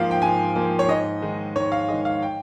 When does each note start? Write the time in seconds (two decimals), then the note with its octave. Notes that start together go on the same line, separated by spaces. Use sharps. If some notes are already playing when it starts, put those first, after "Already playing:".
Already playing: G#2 F3 A#3 F5 G5
0.11 G5
0.22 G#2 G#5
0.55 F3 A#3
0.79 C#5
0.88 G#2 D#5
1.22 D#3 G#3
1.56 G#2 C#5
1.72 F5
1.88 D#3 G#3 D#5
2.05 F5
2.22 G5